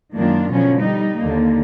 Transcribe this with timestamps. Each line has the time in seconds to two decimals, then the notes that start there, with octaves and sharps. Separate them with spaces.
0.14 F#2 D#3 G#3 A#3 D4 F4
0.51 B2 D3 F3 F#3 C#4
0.82 G3 D#4
1.23 D#2 D3 A#3